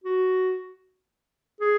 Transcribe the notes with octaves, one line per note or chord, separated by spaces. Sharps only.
F#4
G#4